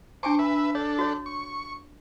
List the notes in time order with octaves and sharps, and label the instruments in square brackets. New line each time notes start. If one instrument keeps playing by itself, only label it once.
[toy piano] D4 G#5 A5 [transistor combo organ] C5 C#6 D6
[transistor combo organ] B4 E5
[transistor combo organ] D4 A4 [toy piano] C#5
[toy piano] F#4 C#5
[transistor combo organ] C#6